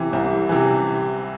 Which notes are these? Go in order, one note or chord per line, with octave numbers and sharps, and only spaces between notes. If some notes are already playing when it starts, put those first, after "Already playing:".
Already playing: C3 E3
C2
C3 E3